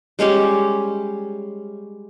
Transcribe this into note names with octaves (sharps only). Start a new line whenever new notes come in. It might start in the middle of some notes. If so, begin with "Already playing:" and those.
G3 G#3 C#4 G4